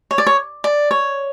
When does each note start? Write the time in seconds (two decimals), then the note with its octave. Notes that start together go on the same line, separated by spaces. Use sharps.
0.11 C#5
0.18 D5
0.27 C#5
0.64 D5
0.91 C#5